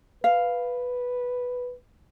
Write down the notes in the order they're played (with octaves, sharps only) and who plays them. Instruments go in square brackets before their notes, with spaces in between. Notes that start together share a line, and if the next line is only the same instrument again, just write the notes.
[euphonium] B4 [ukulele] F5